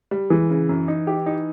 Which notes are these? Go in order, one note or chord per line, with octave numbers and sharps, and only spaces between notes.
G3
E3 G#3
C#3
F#2
D#4
G4
D#4